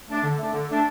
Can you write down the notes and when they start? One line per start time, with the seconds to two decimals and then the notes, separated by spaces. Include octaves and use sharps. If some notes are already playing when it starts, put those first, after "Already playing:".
0.09 A3 D4
0.23 D3
0.38 A3 D4
0.53 D3
0.69 A3 D4